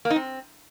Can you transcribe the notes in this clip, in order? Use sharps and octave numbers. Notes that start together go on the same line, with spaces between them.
A#3
D#4
C4